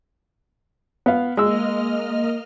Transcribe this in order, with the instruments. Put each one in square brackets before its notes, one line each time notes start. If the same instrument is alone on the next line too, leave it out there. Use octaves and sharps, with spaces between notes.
[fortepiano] B3 F5
[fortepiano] G#3 E6 [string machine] A#3 D#5 F6